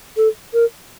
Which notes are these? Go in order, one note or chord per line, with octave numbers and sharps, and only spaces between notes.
A4
A#4